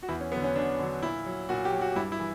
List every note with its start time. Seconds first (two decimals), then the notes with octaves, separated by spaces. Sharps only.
0.03 F#4
0.09 E2 E4
0.21 C#4
0.32 D3 F#3 B3
0.44 C#4
0.56 E2 D4
0.79 D3 F#3
1.03 A#2 E4
1.26 F#3
1.49 A#2 F#4
1.65 G4
1.73 F#3
1.81 F#4
1.96 G2 E4
2.12 E4
2.19 E3